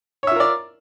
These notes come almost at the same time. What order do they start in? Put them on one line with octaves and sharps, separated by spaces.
C#5 E5 F4 A#4 D5